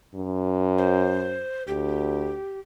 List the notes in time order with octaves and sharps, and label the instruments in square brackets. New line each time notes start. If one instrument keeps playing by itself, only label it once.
[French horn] F#2
[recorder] C5
[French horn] D2 [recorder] G4